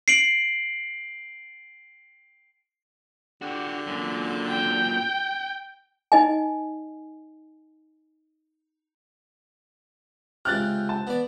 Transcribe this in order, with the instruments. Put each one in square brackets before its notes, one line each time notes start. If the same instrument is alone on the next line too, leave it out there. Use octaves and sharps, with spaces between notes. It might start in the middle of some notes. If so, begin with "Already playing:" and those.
[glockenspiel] C7 D7 F#7
[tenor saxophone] D3 [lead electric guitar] F#4 G4
[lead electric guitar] F#2 A#2
[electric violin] G5
[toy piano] D#4 D#5 G#5
[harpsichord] C#2 C3 G5 [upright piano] F6 F#6 A6
[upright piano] A5
[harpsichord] B3 D5